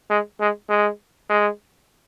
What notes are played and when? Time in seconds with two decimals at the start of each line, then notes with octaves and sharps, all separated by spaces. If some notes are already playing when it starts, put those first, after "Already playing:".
0.10 G#3
0.40 G#3
0.69 G#3
1.29 G#3